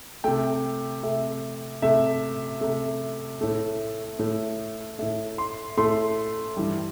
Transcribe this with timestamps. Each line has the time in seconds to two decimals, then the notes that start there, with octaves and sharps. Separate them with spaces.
0.24 C3 A3 G5
1.03 C3 A3 E5
1.82 C3 A3 E5
2.61 C3 A3
3.41 A2 A3
4.19 A2 A3
4.99 A2 A3 E5
5.38 C6
5.77 A2 A3 C6
6.57 G2 E3 G3